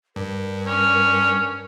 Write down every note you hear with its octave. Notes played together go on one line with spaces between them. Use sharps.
G2 A#4
C#4